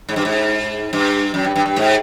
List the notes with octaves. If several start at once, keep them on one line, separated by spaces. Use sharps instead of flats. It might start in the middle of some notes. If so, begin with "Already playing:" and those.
G#2
G2
G#2
G2
F#2
G2
G2
G2
G#2